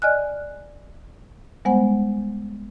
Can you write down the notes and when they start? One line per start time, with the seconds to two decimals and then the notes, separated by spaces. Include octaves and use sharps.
0.02 D5 D#5 G#5 F6 F#6
1.65 G3 G#3 B3 C5 F#5 G#5